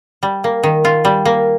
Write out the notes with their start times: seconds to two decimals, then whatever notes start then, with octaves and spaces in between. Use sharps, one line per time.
0.23 G3
0.44 A#3
0.63 D#3
0.85 F4
1.05 G3
1.25 A#3